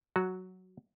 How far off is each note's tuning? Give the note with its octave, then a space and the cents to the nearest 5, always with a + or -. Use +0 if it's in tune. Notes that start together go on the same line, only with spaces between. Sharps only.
F#3 +0 F#4 -5